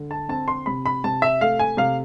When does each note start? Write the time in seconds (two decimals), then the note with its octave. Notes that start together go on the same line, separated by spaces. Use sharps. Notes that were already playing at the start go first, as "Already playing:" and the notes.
Already playing: D3
0.11 A5
0.29 C4 A5
0.48 C6
0.66 C3 B5
0.86 B5
1.04 C3 A5
1.22 E5
1.41 A3 F5
1.59 G#5
1.77 C3 F5